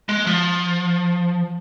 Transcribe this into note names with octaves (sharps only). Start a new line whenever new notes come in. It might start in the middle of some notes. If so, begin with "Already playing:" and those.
G#3
F3